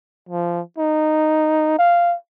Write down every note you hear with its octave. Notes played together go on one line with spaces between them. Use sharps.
F3
D#4
F5